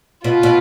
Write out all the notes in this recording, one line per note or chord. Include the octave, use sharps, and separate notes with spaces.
B2 F4
B2